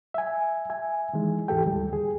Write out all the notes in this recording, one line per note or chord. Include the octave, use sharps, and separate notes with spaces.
E5 G#5
E5 G#5
D#3 E3 G#3
D#2 G#2 E3 G4 A4 G5
D2 G3
D#2 G#4